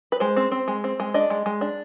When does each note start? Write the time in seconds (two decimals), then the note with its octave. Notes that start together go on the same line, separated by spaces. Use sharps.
0.12 B4
0.20 G#3 C5
0.37 C4
0.52 C4
0.68 G#3
0.84 C4
1.00 G#3
1.14 D4 D#5
1.30 G#3
1.46 G#3
1.61 D4